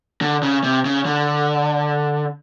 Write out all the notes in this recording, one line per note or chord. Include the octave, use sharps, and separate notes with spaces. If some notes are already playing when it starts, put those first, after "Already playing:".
D3
C#3
C3
C#3
D3